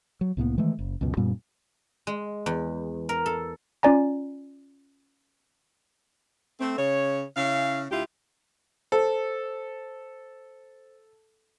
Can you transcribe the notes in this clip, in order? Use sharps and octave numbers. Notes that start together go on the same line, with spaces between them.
F#3
C2 A2 A#3 B3
D#3 E3 G#3 A3
F#1
C#2 F#2 B2
F#2 A#2 G3 B3
G#3
E2
A#4
A4
C#4 F4 D5 G#5 A#5
A3 C4
C#3 C#5
C#3 C#4 E4 F5
D2 E4 F4 G4
A4 C5